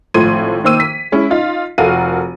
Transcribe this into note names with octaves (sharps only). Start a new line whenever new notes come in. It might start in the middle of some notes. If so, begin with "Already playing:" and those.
G#1 A2 F3 C6 G#6 D#7
D#3 A#3 C5 E6 D#7
B6
G#3 C#4 E4
D#4 F4
F1 F#4 A4 A#4 F5 D#7